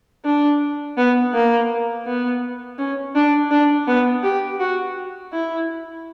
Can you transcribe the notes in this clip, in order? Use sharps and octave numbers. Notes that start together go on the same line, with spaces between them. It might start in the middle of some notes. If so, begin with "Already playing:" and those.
D4
B3
A#3
B3
C#4
D4
D4
B3
G4
F#4
E4